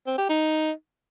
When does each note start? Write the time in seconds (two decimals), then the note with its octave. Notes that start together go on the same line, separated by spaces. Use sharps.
0.07 C4
0.18 G4
0.29 D#4